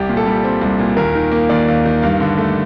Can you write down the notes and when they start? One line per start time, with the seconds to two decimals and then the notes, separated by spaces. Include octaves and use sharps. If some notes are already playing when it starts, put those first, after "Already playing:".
Already playing: C2 G4
0.09 A#2
0.17 A4
0.26 G3
0.44 C4
0.61 C2
0.79 A#2
0.97 D#2 A#4
1.15 D#3
1.32 A#3
1.49 D#2 D5
1.68 D#2
1.86 D#3
2.02 G2 F5
2.20 D3
2.38 A3